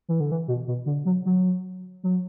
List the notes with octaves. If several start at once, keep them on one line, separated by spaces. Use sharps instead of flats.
E3
D3
E3
B2
B2
D3
F#3
F#3
F#3